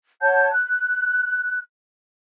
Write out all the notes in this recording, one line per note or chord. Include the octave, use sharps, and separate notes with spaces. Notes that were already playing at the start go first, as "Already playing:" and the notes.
C#5 F#5 A5 G6
F#6